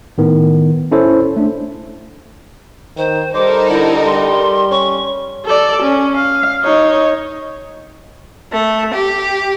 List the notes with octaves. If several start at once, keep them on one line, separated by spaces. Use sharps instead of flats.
A2 D#3 B3
C#4 E4 A4 C5 C#5
A3 D4
D#3 C5
G3 D#4 A4 A#4 C5 D6
D3 E4
G3 C6
C#4 C#6
A4 D5
C#4
F5
D#4 C#5
A3
G4